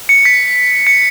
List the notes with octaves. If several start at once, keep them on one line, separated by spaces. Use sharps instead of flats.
C#7
B6
C#7